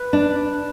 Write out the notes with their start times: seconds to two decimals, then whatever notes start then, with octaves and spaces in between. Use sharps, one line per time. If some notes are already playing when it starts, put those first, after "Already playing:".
Already playing: B4
0.13 D4